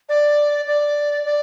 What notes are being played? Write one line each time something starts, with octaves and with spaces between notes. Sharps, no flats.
D5
D5
D5